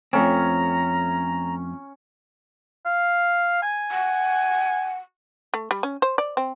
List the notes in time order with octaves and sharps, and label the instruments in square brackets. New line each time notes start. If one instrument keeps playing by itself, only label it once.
[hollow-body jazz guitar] F2 A3 C4 [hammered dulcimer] C#4 [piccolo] A#5
[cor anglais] F5
G#5
[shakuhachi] F#5
[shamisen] A3
G3
C#4
C5
D5
C4